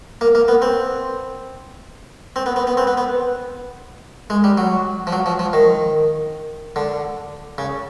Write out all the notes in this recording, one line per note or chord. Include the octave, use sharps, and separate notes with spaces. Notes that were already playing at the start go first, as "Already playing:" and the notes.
A#3
A#3
B3
C4
C4
B3
B3
B3
C4
B3
B3
G#3
G3
F#3
F3
F#3
F3
F3
D#3
D3
C#3